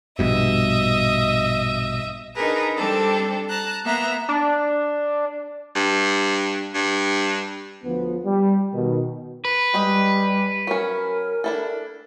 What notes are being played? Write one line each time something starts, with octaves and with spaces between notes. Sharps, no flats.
A#1 G2 B2 D#5 E5
D4 D#4 G#4 A#4 B4
G3 C4 D4 A4
A5 A#5 F#6
A#3 B3 E5 A#5
D4
G2
G2
D2 F3 B3
G3
B2 D#3
B4
G3 G#3 G4 D#5
F#3 C#4 A#4
D4 E4 A4